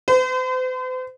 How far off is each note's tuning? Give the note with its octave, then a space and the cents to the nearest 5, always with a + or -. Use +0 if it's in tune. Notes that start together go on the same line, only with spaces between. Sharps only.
C5 -45